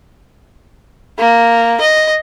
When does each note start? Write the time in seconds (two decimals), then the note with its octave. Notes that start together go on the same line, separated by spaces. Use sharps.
1.19 A#3
1.81 D#5